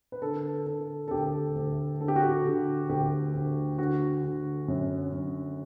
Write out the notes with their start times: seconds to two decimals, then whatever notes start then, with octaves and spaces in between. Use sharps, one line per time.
0.12 B4
0.22 D3 A4
0.66 D3 A4
1.08 A4
1.11 D2 G4
1.56 D2
2.00 D3 A4
2.08 G4
2.16 F#4
2.23 G4
2.45 D3
2.89 D2 G4
3.34 D2
3.78 D3 F#4
4.24 D3
4.68 F#2
5.12 F#2